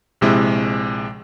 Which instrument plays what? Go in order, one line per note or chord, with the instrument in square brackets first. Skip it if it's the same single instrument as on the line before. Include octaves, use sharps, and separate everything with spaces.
[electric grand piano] A#1 C3 G#3 E4